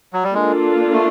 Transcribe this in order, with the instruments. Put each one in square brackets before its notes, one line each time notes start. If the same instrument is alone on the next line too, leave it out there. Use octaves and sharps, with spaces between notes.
[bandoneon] F#3
G3
[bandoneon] G#3 [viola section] A#3 D4 F4 A4
[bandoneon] A3